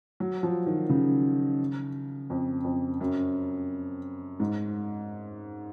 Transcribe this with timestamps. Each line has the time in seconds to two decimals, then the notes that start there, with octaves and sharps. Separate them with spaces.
0.20 F#3
0.43 F3
0.66 D#3
0.89 C#3
2.30 F2
2.64 F2
3.01 F#2
4.40 G#2